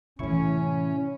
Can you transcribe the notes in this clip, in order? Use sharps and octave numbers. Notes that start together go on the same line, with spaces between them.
A2 C3 E3 C#4 E4 C#6